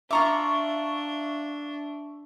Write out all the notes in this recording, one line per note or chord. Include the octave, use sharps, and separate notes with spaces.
D4 F4 E5 A#5 C#6 D6